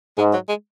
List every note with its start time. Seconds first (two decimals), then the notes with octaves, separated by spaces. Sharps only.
0.18 G#2 G#3
0.33 F#3
0.49 G#3